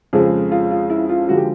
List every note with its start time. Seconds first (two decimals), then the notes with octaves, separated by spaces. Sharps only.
0.13 F2 C#3 F3 G#3 G#4
0.51 F4
0.71 F4
0.90 E4
1.09 F4
1.29 D3 F3 G#3 F#4
1.37 G4